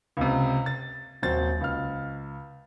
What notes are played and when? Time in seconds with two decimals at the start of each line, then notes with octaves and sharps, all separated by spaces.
0.17 C#2 C3
0.66 A6
1.22 D#1 F#3 C4 A6
1.61 C#2 F6